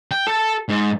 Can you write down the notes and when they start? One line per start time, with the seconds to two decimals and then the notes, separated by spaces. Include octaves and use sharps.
0.11 G5
0.27 A4
0.69 G#2